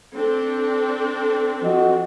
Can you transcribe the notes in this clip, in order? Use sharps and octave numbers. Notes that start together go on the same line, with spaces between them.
C4 D4 A4
F3 F#4 D#5